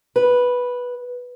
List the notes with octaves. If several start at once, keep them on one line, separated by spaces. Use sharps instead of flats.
B4